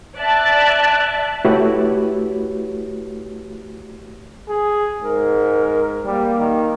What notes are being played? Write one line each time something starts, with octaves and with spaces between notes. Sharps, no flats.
D5 E5 A5 F#6
A3 E4 F#4 G4 B4 C#5
G#4
G#2 A#4
G3 A#3
D#3